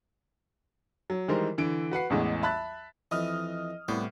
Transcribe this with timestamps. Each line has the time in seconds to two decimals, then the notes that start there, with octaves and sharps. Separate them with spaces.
1.10 F#3
1.28 D#3 E3 G3 G#3 A#4 C5
1.58 D3 E3 D7
1.91 F#4 B4 F#5 C7
2.10 A1 E2 E3 G#3
2.42 E5 A5 B5 F#6 A6
3.11 F2 E3 D#5 D#6 F6
3.88 C2 A2 B3 D5